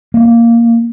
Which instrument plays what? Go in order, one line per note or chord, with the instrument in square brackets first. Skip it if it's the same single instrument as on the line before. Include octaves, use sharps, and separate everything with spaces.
[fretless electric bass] A#3